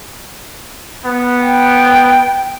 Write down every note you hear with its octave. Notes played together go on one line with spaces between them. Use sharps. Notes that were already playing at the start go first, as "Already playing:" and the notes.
B3
G5